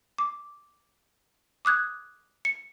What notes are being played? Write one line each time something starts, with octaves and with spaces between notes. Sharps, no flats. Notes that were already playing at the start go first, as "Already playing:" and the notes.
D6
D6 D#6 F#6 G#6
C#7